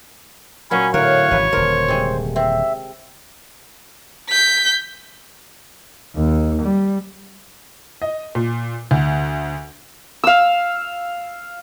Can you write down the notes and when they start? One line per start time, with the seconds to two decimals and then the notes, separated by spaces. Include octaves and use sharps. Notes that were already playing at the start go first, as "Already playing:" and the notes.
0.71 A#2 F#3 C#4 G#5 B5
0.94 A2 D3 A#4 C#5 F5 F#6
1.31 G#1 C#3 E3 B4
1.53 D#1 D3 A#4 C5
1.88 C3 G#3
2.36 C4 E5
4.30 G6 B6
6.16 D#2
6.62 G3
8.02 D#5
8.35 A#2
8.91 D2
10.24 F5 E6